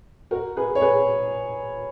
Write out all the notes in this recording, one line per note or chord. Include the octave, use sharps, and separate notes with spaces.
F#4 A#4
G#4 B4
C#5
G#4 B4